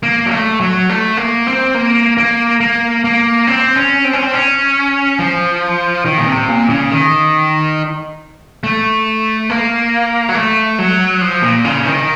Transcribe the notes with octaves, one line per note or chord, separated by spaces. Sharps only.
A#3
F#3
A3
F#3
A3
A#3
C4
A#3
A#3
A#3
A#3
C4
C#4
C4
C#4
C4
C#4
F3
D#3
A#2
C3
A#2
C#3
D#3
A3
A#3
F#3
A3
F#3
F3
A#2
C#3
D#3